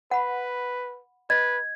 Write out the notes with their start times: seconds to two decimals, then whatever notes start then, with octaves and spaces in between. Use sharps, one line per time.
0.11 B4 F#5 B5
1.30 B4 D#5 G#6